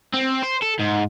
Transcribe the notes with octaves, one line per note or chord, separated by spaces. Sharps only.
C4
C5
A4
G#2